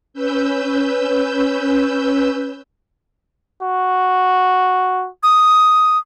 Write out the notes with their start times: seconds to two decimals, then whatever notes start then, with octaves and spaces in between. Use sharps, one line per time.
0.13 C#4 B4 E6 G6
3.62 F#4
5.23 D#6